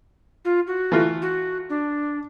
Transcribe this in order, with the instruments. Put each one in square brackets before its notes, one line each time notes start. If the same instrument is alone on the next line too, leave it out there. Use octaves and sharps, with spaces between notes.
[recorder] F4
F#4
[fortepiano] E3 A3 F4
[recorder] F#4
D4